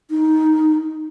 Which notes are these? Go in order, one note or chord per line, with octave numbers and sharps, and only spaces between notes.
D#4